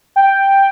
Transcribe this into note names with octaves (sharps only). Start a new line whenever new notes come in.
G5